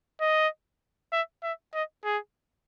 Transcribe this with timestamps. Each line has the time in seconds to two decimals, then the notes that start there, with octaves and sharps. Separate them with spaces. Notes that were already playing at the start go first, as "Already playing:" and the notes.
0.20 D#5
1.12 E5
1.43 E5
1.74 D#5
2.04 G#4